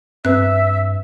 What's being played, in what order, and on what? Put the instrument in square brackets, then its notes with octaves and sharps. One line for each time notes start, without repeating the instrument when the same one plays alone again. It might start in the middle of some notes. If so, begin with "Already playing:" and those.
[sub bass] G2 [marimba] C4 [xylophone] B4 F#6 [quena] E5